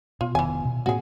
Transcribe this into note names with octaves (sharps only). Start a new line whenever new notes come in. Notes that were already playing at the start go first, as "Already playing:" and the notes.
B2 F4
F1 D#3 E3 B3 G#5
B2
A2 A#3 C4 F#4 G#4